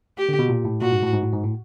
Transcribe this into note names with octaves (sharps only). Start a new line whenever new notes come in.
G4
D3
B2
A#2
A2
A#2 F#4
G#2
A2
G#2
A2
G#2
A2